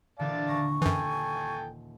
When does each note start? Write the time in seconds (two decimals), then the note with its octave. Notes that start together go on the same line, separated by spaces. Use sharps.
0.19 A#2 D3 E3 D5 F5 A5
0.48 D#1 C#6 A#6
0.82 F#2 E3 A4 G5 G#5 G6